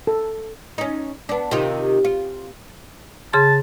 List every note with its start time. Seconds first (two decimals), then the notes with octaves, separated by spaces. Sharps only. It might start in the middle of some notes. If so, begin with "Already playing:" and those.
0.07 A4
0.78 C#4 D#4
1.29 B3 D4
1.51 C3 D#3 F4
2.05 F4
3.33 C#3 G#4 A5 C6